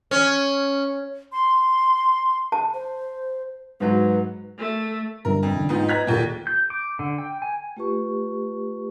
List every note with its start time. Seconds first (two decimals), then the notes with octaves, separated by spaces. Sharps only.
0.11 C#4
1.32 C6
2.52 A5
2.74 C5
3.80 G#2 F#3 B4
4.59 A3
5.25 G1 G2 A#4
5.43 F2
5.55 D3
5.69 G#2 B3 D#4 F4 G5
5.89 B4 D#5 A#5 F#6 G#6 B6
6.07 D#2 A#2 G4 A4
6.47 G6
6.70 D6
6.99 D3
7.18 G5
7.42 G#5
7.77 A3 F4 G4 B4 C#6